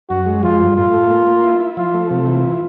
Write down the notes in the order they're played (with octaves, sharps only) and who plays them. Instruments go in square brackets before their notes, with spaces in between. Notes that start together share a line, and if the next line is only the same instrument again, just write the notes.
[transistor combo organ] F#2 [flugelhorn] F#4
[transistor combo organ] G#3
[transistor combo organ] F3 [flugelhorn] F4
[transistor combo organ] G2
[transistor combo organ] A2 [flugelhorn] F4
[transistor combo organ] A3
A#3
A#3
E4
E4
[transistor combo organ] F3 [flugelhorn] F4
[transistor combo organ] A3
[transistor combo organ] C3 [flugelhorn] F4
[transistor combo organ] E3